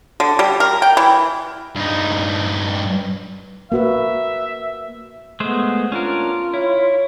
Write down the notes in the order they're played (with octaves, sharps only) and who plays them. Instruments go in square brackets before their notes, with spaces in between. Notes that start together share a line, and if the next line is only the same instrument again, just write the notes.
[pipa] D3
G3
A#4
G5
E3
[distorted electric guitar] G2 D#4
[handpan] A#3 F#4 B4 [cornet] E5
[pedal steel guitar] G#3 A3 C5 [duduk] B3
[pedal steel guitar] C#4 D4 A#4 [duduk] F4
[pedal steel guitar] E4 [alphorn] C#5